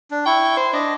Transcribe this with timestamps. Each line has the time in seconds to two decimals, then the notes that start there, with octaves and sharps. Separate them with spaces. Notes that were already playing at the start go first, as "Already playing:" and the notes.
0.11 D4
0.26 E4 G5 C#6
0.57 C5
0.73 D4 D#5